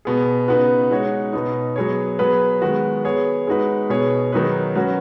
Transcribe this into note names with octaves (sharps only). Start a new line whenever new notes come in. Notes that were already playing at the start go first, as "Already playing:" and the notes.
B2 B3 G#4
C#3 B3 D#4 F#4 B4
G#3 D#4 F#4 C#5
B2 B3 D#4
F#3 B3 G#4 C#5
F#3 B3 G#4 B4
D#3 G#3 B3 F#4
B3 G#4 C#5
G#3 D#4 F#4 B4
B2 B3 G#4 C#5
D#3 F#3 D#4 G#4 B4
F#3 C#4 F#4 B4